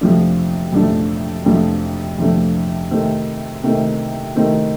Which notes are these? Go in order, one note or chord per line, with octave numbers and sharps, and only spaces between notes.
F2 C3 F3 A3 D4
F2 C3 F3 A3 D4
F2 C3 F3 A3 D4
F2 C3 F3 A3 D4
C3 D#3 A3 C4
C3 D#3 A3 C4
C3 D#3 A3 C4